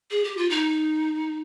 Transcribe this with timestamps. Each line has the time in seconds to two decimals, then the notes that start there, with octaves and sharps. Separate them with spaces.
0.11 G#4
0.24 G4
0.37 F4
0.50 D#4